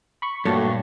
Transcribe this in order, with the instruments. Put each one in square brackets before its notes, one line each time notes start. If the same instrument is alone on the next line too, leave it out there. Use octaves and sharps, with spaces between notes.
[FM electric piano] B5 C#6
[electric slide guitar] G2 [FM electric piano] A#2 C#5 A5 [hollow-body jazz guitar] F#3 A3